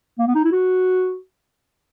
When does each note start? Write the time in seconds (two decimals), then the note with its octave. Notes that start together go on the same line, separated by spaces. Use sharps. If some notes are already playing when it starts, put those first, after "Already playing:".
0.19 A#3
0.27 B3
0.35 D#4
0.44 E4
0.52 F#4